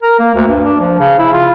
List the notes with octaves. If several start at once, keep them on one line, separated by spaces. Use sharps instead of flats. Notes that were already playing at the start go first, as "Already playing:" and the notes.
A#4
A#3
D2
G2
D4
F3
C#3
E4
F4